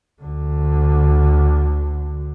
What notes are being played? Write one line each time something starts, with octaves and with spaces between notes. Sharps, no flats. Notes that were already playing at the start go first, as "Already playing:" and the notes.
D2 D3